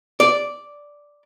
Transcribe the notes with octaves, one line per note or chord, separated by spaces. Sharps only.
D5